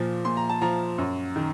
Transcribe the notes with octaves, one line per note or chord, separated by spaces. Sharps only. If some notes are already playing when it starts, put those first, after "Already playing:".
Already playing: A#2 F3
A#2 C6
A#5
A5
F3 A#5
F#2
D#3